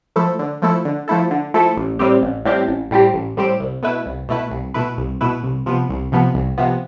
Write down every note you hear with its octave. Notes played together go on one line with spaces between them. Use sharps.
F3 A3 E4 A4
D3
F3 A3 E4 A4
D3
F3 A3 E4 A4
D3
F3 A3 E4 A4
A1
A2 G3 C4 G4
A1
A2 G3 C4 G4
A1
A2 G3 C4 G4
A1
A2 G3 C4 G4
C2
B2 A3 E4 B4
C2
B2 A3 E4 B4
C2
B2 A3 E4 B4
C2
B2 A3 E4 B4
C2
C3 F3 B3
C2
C3 F3 B3
C2
C3 F3 B3